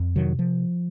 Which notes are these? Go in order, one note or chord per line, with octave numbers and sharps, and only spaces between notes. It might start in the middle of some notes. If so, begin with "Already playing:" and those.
Already playing: F2
C3 D#3 F#3
F3